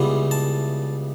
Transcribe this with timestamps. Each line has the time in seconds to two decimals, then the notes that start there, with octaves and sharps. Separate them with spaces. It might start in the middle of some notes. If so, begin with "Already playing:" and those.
Already playing: C#2 C#3 E3 G3 B3
0.31 A5